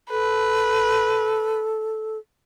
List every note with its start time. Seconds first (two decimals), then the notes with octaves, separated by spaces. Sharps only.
0.10 A4 B4